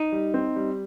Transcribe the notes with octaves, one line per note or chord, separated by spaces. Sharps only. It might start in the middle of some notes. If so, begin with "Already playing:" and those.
Already playing: D#4
G3
C4
G3